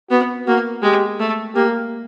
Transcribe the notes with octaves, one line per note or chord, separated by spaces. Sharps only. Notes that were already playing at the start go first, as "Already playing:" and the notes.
B3 F#4
A#3 F#4
G#3 G4
A3
A#3 G4